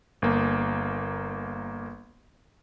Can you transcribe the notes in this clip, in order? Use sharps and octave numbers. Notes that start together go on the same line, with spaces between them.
G1 A#3